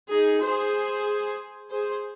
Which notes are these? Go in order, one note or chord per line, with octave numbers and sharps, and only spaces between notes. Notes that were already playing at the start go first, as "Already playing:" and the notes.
D#4 G#4
G#4 C5
G#4 C5